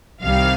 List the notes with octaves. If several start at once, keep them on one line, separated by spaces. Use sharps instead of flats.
C2 C3 D#3 G3 F5